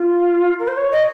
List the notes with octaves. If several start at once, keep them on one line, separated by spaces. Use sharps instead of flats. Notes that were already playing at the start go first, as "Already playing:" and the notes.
Already playing: F4
A#4
C5
C#5
D#5